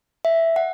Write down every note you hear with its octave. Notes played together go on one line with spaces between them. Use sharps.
E5
F#5